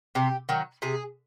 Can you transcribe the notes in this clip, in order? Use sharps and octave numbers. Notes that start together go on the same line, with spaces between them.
C3 G4
D#3 F#3
C3 G#4